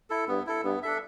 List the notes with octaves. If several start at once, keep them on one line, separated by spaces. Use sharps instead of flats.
E4 A4
G2 B3
E4 A4
G2 B3
D4 A4 E5